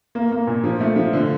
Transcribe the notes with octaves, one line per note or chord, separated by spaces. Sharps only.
A#3
A#3
A#2
F3
A3
F3
D3